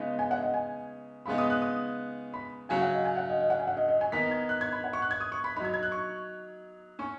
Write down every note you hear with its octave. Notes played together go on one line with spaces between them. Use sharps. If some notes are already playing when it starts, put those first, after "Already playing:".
Already playing: C#3 G#3 B3 D#4
G#5
F#5
D#5
G#5
C#3 G#3 B3 D#4 B5
D#6
F#6
D#6
B5
C#3 F#3 C#4 G#5
F#5
D#5
G#5
F#5
D#5
D#5
F#5
G#5
F#5
D#5
D#5
G#5
D#3 B3 D#4 B6
G#6
F#6
G#6
B5
F#5
C#6
F#6
G#6
D#6
C#6
B5
F#3 D#4 B5 G#6
G#6
F#6
C#6
C#4 C#6